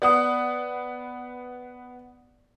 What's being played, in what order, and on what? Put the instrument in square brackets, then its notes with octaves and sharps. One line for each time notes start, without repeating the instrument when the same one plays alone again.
[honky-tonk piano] B3 F#5 [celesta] D5 D#6